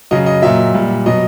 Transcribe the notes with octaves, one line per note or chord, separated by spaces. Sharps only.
C#3 F#3 D#5
D#5
A#2 F#3 E5
A#2 G3
B2 F#3 D#5